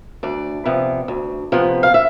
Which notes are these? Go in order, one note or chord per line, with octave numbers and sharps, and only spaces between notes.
D2 D5
C3 F3 B3
D2
C3 F3 B3
F5
E5